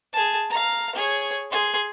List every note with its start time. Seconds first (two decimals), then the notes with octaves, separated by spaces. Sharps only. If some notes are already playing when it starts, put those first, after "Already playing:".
0.13 G#4 A5
0.50 F5 A#5
0.95 G#4 C#5
1.51 G#4 C6